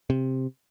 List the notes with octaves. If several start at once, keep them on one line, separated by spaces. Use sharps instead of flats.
C3